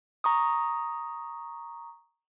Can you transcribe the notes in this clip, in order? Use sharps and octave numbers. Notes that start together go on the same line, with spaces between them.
A#5 C#6 D#6